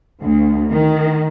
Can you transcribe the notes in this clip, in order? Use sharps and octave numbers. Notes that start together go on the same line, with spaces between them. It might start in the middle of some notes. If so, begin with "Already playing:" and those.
D2
D#3